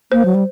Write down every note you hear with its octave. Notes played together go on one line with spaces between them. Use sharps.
A#3 C5
F#3
G3